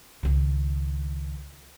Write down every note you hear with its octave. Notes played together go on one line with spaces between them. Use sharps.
C#2 D#3